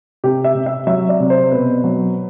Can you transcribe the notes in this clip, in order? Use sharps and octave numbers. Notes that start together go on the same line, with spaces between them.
C3 G4
E5
C3
E5
F#3 E5
D5
C3
C5
B2 B4
F#3